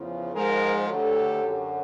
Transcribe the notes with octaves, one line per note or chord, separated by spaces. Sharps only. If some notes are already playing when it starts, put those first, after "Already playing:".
Already playing: E2 C#3 F3
G#2 F3 G#3 G#4 A#4
D2 D3 F#3 G4 A4
F#2 D3 F#3